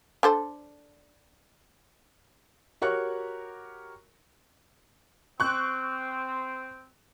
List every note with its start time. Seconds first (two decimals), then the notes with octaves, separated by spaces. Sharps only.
0.23 D4 A4 C5
2.82 F#4 G4 A#4 C#5 C#6 F#6
5.40 C4 C#6 F#6